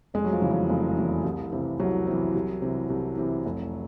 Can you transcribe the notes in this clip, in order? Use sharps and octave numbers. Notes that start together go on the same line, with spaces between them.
F1 G#3
F#3
F3
E2 C#3 E3
F3
F1
E2 C#3 E3
C2
C3 E3
C2 F#3
C3 E3
C2
C3 E3
C2
C3 E3
F1